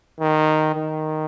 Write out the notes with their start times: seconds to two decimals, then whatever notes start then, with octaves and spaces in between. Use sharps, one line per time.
0.20 D#3
0.75 D#3